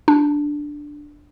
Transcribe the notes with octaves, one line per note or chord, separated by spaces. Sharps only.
D4